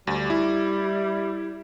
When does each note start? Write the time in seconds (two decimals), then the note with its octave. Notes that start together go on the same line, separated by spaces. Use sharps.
0.07 D2 G3
0.30 E4